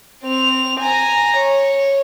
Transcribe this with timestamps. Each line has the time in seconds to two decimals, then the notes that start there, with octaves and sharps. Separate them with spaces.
0.23 C4 F7
0.80 G#5 A#5
1.37 C#5